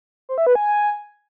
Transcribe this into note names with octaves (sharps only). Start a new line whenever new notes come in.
C5
E5
B4
G#5